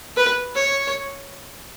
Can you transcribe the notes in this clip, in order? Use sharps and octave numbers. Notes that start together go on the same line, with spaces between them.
B4
C#5